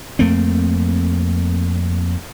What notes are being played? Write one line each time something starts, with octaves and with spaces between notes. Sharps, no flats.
F2 A3 A#3 C4